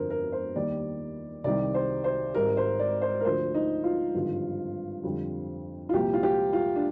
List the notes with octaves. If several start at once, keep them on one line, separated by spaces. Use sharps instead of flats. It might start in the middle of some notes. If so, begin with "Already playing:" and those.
Already playing: G1 F2 D3 A#4 C5
A#4
C5
D#2 D#3 G3 D5
C2 C3 D#3 G3 D5
C5
C5
G#1 G#2 G3 A#4
C5
D5
C5
A#4
D2 D3 F3 C5
D#4
F4
G#1 G2 D3 F3
F2 D3 G3
F4
C2 A#2 F3 G4
F4
G4
F4
D4